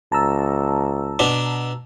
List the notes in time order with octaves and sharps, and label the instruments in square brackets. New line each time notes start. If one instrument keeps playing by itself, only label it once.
[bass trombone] C#2 [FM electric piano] A5 A#5 E6
[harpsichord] B2 D4